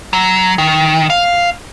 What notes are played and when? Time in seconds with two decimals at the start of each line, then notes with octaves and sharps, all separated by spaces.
0.13 F#3
0.58 D#3
1.10 F5